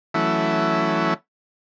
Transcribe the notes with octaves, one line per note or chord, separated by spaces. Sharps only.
E3 F#3 A3 C#4 E4